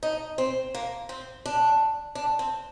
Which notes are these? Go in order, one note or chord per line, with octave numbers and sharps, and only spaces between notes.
D#4
C4
A#3
C4
D4
D4
C4